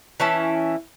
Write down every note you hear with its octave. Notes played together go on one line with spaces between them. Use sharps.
E3 C#4 E4 A5